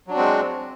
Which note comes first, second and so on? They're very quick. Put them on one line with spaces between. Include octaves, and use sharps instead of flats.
F#3 D4 F#4 C4 G#3